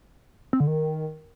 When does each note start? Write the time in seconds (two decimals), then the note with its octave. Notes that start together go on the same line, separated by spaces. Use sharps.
0.53 C4
0.60 D3
0.67 D#3